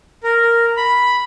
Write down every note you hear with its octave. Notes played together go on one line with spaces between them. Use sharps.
A#4
B5